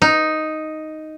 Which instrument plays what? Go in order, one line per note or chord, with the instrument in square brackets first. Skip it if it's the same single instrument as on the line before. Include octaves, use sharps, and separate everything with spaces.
[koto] D#4